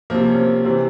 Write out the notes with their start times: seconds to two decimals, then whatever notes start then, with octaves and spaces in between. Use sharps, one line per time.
0.10 C3 F3 A#3
0.29 C#4
0.38 C4
0.65 C3 E3 C4